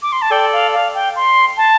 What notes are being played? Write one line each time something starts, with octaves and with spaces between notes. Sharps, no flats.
D6
C6
A5
A4 D5 G5
F5
F5
G5
C6
A5